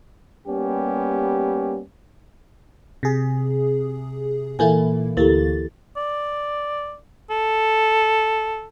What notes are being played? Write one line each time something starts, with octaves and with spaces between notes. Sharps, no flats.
G3 A#3 B3 C#4 G4
C3 G#4
A#2 E3 A#3 E4 A4 G#5
D2 A#3 E4 G4 A4 A6
D5
A4